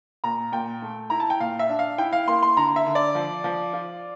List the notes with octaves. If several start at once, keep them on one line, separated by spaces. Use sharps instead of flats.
A#2 A#5
A#2 G5
A3
E4 A#5
A5
G5
A#2 F5
E5
D4
F5
E4 G5
F5
A#3 C6
C6
D3 A#5
E5
D3
D5
F3
F3
F4